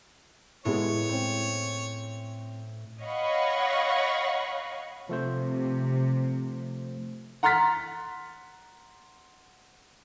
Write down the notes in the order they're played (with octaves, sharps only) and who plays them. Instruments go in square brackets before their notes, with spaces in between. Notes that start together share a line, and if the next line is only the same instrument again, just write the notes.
[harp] A2 [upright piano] G#3 B3 E4 [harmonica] C#5
[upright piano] C4 C#4
[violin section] C#5 D#5 F5 F#5 B5 C#6
[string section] C3 [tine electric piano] F3 A3 C5
[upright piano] F#5 A#5 C6 F6 A6 B6